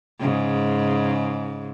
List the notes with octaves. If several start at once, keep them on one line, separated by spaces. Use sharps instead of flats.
G#2 C#3